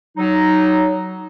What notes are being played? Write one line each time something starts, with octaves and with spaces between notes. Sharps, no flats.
F#3 D#4